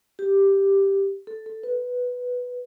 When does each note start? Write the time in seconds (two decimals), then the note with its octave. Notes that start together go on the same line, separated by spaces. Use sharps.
0.19 G4
1.27 A4
1.46 A4
1.63 B4